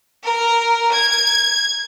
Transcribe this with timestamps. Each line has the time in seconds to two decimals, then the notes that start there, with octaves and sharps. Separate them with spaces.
0.24 A#4
0.91 G#6